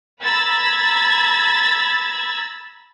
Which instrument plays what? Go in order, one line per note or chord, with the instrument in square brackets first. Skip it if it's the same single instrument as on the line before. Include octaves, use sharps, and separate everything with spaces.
[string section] A#5 B5 E6 G#6 A6